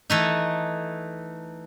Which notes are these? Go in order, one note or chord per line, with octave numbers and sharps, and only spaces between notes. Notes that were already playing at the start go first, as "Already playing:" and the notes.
E3 A3 D#4